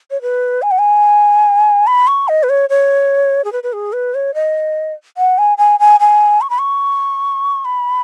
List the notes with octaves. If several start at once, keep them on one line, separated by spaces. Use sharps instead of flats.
C#5
B4
G#5
F#5
G#5
B5
C#6
D#5
B4
C#5
C#5
G#4
B4
B4
G#4
B4
C#5
D#5
F#5
G#5
G#5
G#5
G#5
C#6
B5
C#6
B5